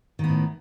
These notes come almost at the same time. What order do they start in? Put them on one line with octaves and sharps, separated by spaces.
D#3 B3 A2